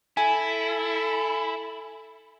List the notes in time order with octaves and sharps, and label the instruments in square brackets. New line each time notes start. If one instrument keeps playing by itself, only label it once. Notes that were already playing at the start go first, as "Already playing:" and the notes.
[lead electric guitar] E4 [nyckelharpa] A4 [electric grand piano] G#5